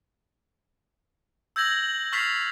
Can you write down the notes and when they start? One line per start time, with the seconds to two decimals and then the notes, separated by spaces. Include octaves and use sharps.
1.56 E6 G6 G#6 A#6 F#7
2.12 C#6 F6 A6 B6 C7 F7